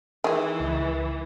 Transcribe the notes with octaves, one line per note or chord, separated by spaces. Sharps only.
D#3 E3 G#3
C#2